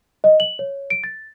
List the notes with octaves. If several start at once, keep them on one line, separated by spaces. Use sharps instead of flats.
D#5
F#7
C#5
D7
A6